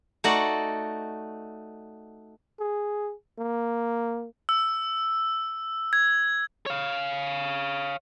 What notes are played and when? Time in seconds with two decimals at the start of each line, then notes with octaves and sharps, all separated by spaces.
0.24 A3 D#4 F#4 D5 F#5
2.60 G#4
3.39 A#3
4.49 E6
5.93 G#6
6.66 C#5 F5